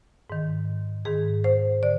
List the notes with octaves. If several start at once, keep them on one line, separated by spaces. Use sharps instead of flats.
G#2 D#3
G#2 D#3 G#4
C5
D3 D5